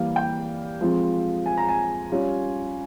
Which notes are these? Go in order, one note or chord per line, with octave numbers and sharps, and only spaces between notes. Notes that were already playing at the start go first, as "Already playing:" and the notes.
Already playing: E3 G3 A#3 F5
G5
F3 G#3 C4 F4
G#5
A#5
G#5
G3 C#4 F4